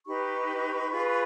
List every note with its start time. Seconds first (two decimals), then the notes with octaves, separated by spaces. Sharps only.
0.06 D#4 G4 B4 B5 C#6
0.90 F4 G#4 B4